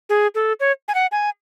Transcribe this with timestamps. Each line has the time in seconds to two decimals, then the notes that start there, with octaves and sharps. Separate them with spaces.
0.09 G#4
0.35 A4
0.60 C#5
0.88 G#5
0.95 F#5
1.12 G#5